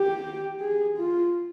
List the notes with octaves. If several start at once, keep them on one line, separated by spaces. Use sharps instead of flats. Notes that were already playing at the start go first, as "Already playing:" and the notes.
Already playing: G4
G#4
F4